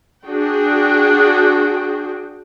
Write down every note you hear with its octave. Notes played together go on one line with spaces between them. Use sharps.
D4 F#4 G#4 G5